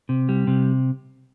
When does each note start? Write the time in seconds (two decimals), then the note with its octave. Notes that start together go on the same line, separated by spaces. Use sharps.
0.09 C3
0.29 G3
0.47 C3